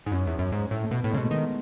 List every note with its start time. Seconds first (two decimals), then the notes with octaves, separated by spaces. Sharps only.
0.06 G#2
0.12 F#2 C#4
0.27 E2
0.39 F#2
0.52 G#2
0.71 A2
0.82 A3
0.91 B2 B3
1.01 A2 A3
1.11 C#3 G#3
1.18 B2 A3
1.31 D#3 B3